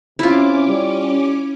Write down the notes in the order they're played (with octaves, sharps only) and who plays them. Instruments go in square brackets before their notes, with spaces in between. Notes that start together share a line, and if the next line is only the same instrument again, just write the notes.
[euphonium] C3 [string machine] C#4 D6 [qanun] E4 F4
[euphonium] G3